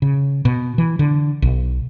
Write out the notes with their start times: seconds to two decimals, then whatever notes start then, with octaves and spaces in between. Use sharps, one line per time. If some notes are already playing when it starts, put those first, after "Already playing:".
0.02 C#3
0.45 B2
0.78 E3
0.99 D3
1.42 B1